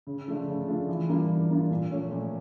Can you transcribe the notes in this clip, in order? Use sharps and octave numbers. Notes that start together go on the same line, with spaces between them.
C#3
F3 A3 D4 F4
C#3
F3 A3 D4 F4
E3
G3 A#3 D4 F4
E3
G3 A#3 D4 F4
A#2
F3 A3 C#4
A#2